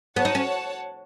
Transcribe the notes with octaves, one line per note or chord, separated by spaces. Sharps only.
B3 F#4 C#5 F#5 A5
D#4
C#4